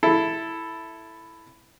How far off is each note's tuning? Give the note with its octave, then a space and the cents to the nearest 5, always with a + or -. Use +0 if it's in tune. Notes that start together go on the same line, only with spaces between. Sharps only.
E4 +0 A4 +0